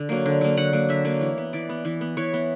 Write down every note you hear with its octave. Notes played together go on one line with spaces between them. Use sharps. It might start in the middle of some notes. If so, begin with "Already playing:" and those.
Already playing: D3
F#3 A#3
D3
F#3 A#3
D3 F#5
F#3 A#3
D3 E5
F#3 A#3
E3
B3
E3 D5
B3
E3
B3
E3 C#5
B3